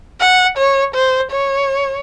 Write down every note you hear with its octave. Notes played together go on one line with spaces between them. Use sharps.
F#5
C#5
C5
C#5